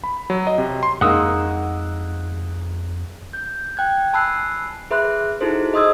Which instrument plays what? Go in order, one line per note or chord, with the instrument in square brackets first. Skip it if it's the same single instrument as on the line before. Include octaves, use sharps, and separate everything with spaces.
[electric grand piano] B5
F#3
D#5
C3
C6
[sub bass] F2 [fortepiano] G#3 A#3 D#4 [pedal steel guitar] F#5 D#6 E6
[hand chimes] G6
G5 F#6 G#6
G#5 A5 B5 E6 F#6 C7
G#4 B4 E5 B5 C6 F#6
D#4 E4 F#4 G#4 A4 C5
G#4 D#5 C6 D#6 E6 G#6